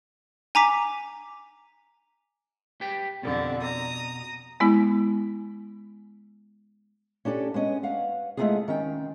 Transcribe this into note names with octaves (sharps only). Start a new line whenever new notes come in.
G#5 A#5 D6 B6
G4 B4 G5
F2 B2 D3 G3
A#5 D#6
G#3 B3 E4
C#4 D4 G4 A4
G#3 B3 C#4 D#5
B4 F5 F#5
G#3 A3 B3 D4 F4 G#4
D#3 C#4 G5